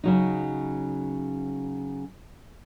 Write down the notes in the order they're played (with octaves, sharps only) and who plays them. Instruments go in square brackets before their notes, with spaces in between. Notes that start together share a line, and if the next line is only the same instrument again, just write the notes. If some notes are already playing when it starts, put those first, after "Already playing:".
[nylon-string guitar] C#3 F#3 D#4